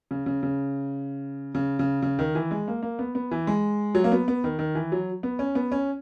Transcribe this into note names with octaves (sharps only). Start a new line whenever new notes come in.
C#3
C#3
C#3
C#3
C#3
C#3
D#3
E3
G#3
A#3
A#3
B3
B3
E3
G#3
F#3
A#3
B3
B3
D#3
D#3
E3
F#3
B3
C#4
B3
C#4